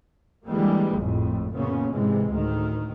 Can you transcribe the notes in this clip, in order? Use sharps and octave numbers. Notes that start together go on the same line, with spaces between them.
D3 E3 G3 G#3 A#3
G#1 F2 A2
F#2 A#2 C#3 B3 C#4
G#2 C3 E3 G#3
D2 A2 D#3